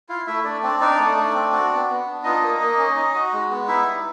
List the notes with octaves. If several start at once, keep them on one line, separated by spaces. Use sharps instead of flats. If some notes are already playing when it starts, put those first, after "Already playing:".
E4 F4 F5
A3 E4 E5
A3 D4 D5
C4 D4 D5
D4 D#4 D5
A3
A3
C4
F#4
B3
B3
D4
D#4 F4 D#5
A#3
A#3
C#4
D#4
F#4
G#3
B3
D#4 E4 E5
G3